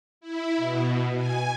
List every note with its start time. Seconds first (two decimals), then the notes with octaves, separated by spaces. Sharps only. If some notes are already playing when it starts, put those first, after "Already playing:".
0.21 E4
0.56 B2
1.17 G#5